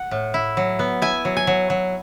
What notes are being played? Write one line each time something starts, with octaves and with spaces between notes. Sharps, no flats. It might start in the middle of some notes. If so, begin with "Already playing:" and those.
Already playing: F#5
A2
E4
F#3
B3
E4 G#5
F#3
G#5
F#3
F#3